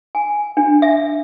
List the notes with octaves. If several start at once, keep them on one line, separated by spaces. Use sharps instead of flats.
G#5
D4
E5